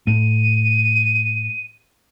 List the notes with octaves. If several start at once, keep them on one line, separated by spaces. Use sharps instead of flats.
A2 D#7